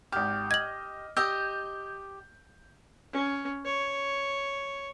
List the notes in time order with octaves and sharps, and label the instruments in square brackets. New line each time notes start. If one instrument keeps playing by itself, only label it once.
[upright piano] G#1 F6 [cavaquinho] G4
[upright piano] D#5 [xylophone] G#6 F#7
[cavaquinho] G4 D#5 [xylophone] E6 [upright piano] G6
[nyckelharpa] C#4
C#5